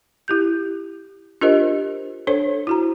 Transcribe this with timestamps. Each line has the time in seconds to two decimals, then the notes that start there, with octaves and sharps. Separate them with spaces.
0.28 E4 G4 G6
1.41 D4 F4 G4 A#4 C5 D#5
2.27 D4 A4 C5 C#5
2.67 E4 F#4 A#5